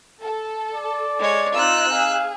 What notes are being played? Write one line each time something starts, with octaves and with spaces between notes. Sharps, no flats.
A4
D5
G#3 C#5
C4 D#4 F4 E6 F#6
G#4 F5